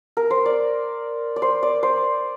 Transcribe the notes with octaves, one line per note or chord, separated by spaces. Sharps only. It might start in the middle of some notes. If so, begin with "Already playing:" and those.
A#4
C5
D5
D5
C5
D5
C5